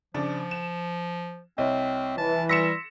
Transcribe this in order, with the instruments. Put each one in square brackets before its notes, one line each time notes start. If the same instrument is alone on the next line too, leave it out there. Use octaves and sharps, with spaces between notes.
[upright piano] C#3 D4 [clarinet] F3
[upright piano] E7
[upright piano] C2 [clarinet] C4 [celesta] C#5 D#5
[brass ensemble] E3 [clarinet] A5
[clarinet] G3 [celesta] C6 E6 B6 [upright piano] A#6 C#7 E7